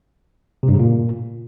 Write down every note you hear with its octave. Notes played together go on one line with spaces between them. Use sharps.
C3
G2
C#3
A#2